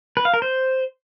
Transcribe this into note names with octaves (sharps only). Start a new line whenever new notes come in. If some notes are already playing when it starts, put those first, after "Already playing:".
B4
F5
A#4
C5